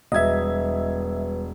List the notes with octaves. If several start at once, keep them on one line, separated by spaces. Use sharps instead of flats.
E1 G3 B4 D#5 E5 G#6